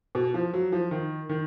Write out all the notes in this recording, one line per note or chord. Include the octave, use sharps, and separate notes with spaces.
B2
F3
F#3
F3
D#3
D#3